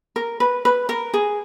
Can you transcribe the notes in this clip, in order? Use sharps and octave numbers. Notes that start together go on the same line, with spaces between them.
A#4
B4
B4
A#4
G#4